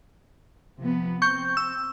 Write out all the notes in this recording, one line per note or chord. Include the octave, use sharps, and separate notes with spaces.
C3 F3 B3
C4 C#6 G6
E6